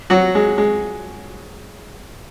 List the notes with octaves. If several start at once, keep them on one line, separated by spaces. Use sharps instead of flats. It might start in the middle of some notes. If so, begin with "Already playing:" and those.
F#3 F#4
G#3
G#3